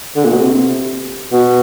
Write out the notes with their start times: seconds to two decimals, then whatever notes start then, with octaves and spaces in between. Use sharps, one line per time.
0.16 D3
0.25 A#2
0.33 B2
0.39 C3
1.32 B2